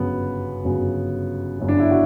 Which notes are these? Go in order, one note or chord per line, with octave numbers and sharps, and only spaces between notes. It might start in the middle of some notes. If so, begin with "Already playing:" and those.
Already playing: G1 F#2 C#3 F#3 B3
G1 F#2 C#3 F#3
G1 F#2 C#3 F#3
D4
E4
F#4